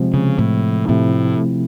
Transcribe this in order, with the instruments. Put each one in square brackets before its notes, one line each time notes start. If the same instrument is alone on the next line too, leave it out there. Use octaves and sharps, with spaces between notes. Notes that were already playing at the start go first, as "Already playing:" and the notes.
Already playing: [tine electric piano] C3 F3 G#3 C4
[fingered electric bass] C#3
A2
[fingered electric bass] A2 [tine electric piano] C3 F3 A3 C4 E4